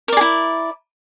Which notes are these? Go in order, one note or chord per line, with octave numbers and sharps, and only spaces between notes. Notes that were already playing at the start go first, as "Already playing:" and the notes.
E4 G#4 A#4 D5